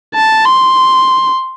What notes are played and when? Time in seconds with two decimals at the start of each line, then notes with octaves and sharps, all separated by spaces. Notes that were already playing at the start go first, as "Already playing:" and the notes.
0.15 A5
0.45 C6